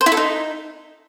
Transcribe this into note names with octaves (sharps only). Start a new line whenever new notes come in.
C5
E4
A4
D#4